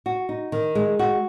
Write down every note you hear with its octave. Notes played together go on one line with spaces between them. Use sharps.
F#4
D#4
D#3
G#3
F#4